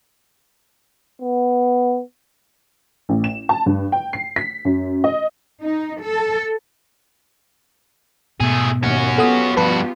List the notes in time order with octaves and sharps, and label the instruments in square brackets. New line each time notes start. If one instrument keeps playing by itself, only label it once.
[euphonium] B3
[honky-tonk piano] A1
E7
A5
G2
G5
C7
B6
F#2
D#5
[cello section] D#4
A4
[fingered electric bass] G#2 B2 G#3 [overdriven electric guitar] A3 G#4
[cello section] D#2 [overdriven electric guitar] C#4 F#4
[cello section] B3 F4 G4 [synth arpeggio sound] A4 F#5 D#6
[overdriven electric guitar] G2 F#4 [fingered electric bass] F3 [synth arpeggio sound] B4 A5 B5